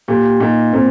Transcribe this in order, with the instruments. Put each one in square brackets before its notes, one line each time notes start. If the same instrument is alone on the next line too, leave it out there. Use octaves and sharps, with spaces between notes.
[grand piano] A#2 [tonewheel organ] G4
[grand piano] A#2 [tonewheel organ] D#4
[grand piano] A#2 [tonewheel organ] C4